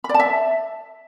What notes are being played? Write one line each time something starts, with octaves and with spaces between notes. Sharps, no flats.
B5
D5
A5
E5